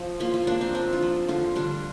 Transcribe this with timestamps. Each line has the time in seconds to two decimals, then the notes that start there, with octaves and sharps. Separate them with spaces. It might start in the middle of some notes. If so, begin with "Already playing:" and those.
Already playing: F3
0.20 A#3 F4
0.34 F4
0.47 A#3 D4
0.61 C4
0.75 F3 D4
0.93 F4
1.03 F3
1.29 D3 F4
1.56 G3 D4